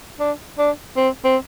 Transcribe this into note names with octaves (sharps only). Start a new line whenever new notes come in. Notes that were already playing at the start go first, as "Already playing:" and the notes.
D4
D4
C4
C4